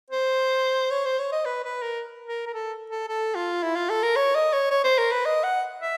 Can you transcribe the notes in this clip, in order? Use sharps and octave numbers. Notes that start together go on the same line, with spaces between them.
C5
C#5
C5
C#5
D#5
B4
B4
A#4
A#4
A#4
A4
A4
A4
F4
E4
F4
A4
A#4
C#5
D#5
C#5
C#5
C5
A#4
B4
D#5
F#5
E5